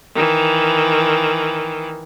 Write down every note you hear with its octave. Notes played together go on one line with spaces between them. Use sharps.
D#3 E3